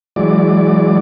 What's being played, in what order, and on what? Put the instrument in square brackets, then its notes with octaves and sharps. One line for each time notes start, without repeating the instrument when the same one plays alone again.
[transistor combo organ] E3 F#3 G#3 D5